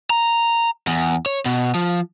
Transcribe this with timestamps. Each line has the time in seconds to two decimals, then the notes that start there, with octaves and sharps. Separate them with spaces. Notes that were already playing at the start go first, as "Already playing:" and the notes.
0.10 A#5
0.87 E2
1.26 C#5
1.46 B2
1.75 F3